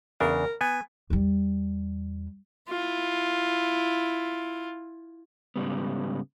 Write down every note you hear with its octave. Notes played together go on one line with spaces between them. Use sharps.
E2 C#3 D4 A#4
B3 G#5
E2 G3
E4 F4
G#2 C#3 G3 B3